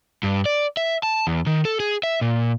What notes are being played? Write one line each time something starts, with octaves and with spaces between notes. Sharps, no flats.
G2
D5
E5
A5
E2
D#3
A4
G#4
E5
A#2